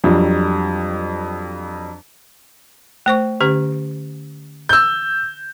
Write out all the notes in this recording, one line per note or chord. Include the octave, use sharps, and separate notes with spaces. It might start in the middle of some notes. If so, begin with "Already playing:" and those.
F2 F#3 G3 D4
A3 C5 C#6
D3 C#4 G4
E6 G6